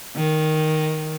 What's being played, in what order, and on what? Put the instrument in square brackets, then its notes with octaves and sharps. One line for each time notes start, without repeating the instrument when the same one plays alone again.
[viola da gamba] D#3